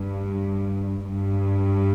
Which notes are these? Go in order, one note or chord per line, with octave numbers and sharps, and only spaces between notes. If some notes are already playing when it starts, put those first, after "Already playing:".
Already playing: G2
G2